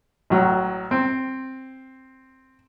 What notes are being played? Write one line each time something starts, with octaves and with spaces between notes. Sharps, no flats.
A1 F#3
C4